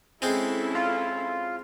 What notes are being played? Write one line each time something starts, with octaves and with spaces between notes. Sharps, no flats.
G#3 C4 C#4 E4 A4
F4